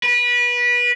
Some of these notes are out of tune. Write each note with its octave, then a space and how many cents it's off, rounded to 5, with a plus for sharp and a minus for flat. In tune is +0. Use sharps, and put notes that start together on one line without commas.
B4 -25